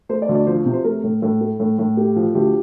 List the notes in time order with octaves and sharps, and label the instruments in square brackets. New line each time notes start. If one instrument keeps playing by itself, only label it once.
[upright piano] A3 C5
D5
D2
D5
F3 C5
C3
C5
A3 A#4
A2
A2 A4
A3
A2
A2
A3 G4
F3
D2 G4